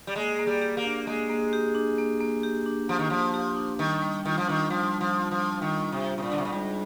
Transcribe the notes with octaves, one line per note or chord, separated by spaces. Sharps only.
G3
G#3 A#3
A#3
G3
G4
A#3
D4
G#3 A#3
A#3
G4
D4
A#3
A#3
G4
D4
F3 A#3
D#3
F3 A#3
G4
D4
D#3 G3
G3
D#3 F4
F3
D#3 D4
F3 G3
G3
F3
F4
F3
D4
D#3 G3
G3
C3
F4
C3
A#2
D3 D4
C3
A#2
G#2 G3